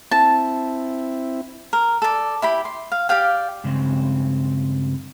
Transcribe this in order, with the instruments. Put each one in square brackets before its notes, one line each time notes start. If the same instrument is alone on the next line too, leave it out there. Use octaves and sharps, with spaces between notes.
[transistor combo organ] C4 E4 [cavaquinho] A5
[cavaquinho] A#4
A4 D5
E4 G4 B5
C6
F5
G4 D5 F5 G5
[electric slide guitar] G2 C#3 G#3 C4